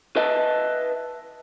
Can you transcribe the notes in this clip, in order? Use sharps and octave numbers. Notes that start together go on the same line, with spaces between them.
B4 D#5 E5 A5